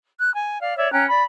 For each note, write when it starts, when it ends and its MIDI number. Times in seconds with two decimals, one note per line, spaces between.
0.19 0.33 90
0.34 0.61 80
0.61 0.75 74
0.61 0.75 77
0.77 0.91 73
0.77 0.91 74
0.77 0.91 76
0.92 1.06 61
0.92 1.06 79
0.92 1.06 82
0.92 1.06 90
1.09 1.21 74
1.09 1.21 83